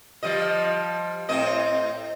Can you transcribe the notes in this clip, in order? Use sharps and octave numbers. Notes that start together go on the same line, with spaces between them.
F3 G3 D#5
A2 C4 D#5